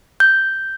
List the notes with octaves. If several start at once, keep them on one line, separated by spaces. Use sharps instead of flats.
G6